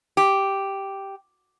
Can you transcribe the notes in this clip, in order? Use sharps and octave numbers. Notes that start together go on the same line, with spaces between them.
G4